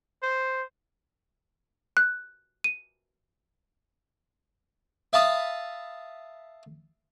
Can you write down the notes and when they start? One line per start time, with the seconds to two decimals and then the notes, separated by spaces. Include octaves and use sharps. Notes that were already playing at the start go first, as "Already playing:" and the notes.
0.22 C5
1.97 F#6
2.64 D#7
5.13 E5 F5 A5 B5 D#6